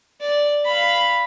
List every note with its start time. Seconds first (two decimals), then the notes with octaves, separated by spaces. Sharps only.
0.21 D5
0.65 F5 B5